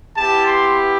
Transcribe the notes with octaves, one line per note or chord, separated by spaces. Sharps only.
B3 E4 G4 A5
C6